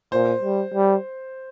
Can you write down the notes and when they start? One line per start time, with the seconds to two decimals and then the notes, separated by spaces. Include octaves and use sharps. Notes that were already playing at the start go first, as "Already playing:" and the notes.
0.12 A#2 C5
0.42 G3
0.74 G3